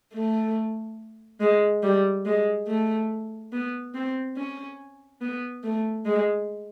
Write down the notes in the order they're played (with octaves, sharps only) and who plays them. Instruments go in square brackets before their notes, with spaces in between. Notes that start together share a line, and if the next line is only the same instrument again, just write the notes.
[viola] A3
G#3
G3
G#3
A3
B3
C4
C#4
B3
A3
G#3